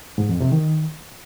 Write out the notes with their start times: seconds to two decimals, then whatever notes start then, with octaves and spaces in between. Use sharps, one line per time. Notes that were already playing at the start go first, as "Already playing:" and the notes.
0.18 G#2
0.29 F2
0.40 C3
0.52 D#3